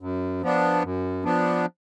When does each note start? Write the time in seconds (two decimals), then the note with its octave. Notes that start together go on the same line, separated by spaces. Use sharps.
0.01 F#2
0.42 F3 B3 D4
0.83 F#2
1.24 F3 B3 D4